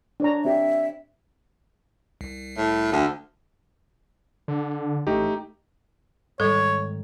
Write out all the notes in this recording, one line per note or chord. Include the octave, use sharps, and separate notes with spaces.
D4 C#5 A#5
C4 G4 E5
C2
A2
D2
D3
A1 A3 D#4 G4
G#2 D#3 G3 A4 C#5